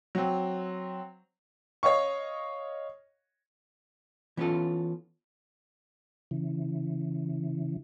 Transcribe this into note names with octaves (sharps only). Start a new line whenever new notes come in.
F#3 C4
C#5 D#5 F5 C#6
E3 B3 C#4 E4 F4 A4
C#3 E3